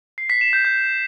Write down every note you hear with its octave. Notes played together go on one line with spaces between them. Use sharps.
C7
B6
E7
G6
G6